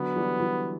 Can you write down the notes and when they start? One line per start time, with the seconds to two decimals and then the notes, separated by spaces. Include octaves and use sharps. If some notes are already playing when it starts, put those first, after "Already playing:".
Already playing: D3 F#3 B3
0.16 E3 G3
0.40 E3 G3